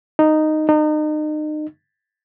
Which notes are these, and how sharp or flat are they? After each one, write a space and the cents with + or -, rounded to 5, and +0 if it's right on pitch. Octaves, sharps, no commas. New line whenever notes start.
D#4 -10
D#4 -35